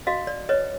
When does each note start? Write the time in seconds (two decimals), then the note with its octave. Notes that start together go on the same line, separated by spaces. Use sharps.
0.07 F#4 D#5 F5
0.27 D5
0.49 B4 C#5 D#5